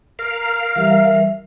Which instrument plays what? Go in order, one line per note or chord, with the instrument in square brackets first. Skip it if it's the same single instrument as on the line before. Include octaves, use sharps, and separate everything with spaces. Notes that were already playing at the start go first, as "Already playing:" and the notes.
[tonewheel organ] A#4 F5
[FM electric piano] E3 G3 [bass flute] E5